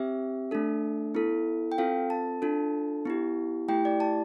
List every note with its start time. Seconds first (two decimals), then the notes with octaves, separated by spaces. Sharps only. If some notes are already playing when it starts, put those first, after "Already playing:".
Already playing: C4 G4 E5
0.51 A3 D4 A4
1.15 B3 E4 A4
1.72 G5
1.78 C4 F4 A4 F5
2.10 A5
2.42 D4 F4 A4
3.05 B3 E4 G4
3.68 A3 E4 G4 G5
3.85 D5
4.00 A5